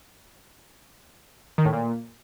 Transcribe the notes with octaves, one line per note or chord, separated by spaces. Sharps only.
D#3
A2
A#2